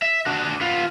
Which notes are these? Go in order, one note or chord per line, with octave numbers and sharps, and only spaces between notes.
E5
D4 F#4
B3 F4